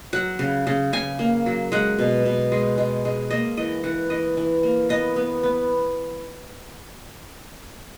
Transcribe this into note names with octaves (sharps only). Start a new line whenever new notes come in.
F#3 F#5
C#3
C#3
C#3 G#5
A#3
F#3
G#3 F#5
B2
B2
G#3
G#3
G#3
A#3 D#5
E3 D#5
E3 F#5
E3 D#5
E3
A#3
B3 D#5
B3
B3